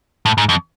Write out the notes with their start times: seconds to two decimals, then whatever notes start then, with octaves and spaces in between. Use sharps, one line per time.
0.26 A2
0.38 G#2
0.49 F2